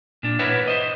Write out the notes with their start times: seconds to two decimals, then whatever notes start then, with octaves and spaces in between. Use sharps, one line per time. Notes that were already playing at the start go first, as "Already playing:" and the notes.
0.23 A#2 D4
0.39 E4 A#4 B4 C#5 E5 F#5
0.68 C5 D#5